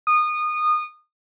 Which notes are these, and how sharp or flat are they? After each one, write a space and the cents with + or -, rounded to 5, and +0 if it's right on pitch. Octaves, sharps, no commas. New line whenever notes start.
D#6 -25